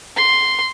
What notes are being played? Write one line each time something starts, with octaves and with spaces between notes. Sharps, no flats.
C6